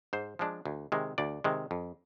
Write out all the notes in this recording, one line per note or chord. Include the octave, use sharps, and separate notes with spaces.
G#2 C5
F3 G#3 D4
D2
C3 D#3 G#3
D2 D5
C3 D#3 G#3
F2